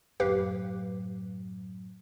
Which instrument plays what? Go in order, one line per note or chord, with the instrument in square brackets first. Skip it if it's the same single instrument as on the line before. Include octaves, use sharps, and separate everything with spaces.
[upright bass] F#2 A2 [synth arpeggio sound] G4 B4 F5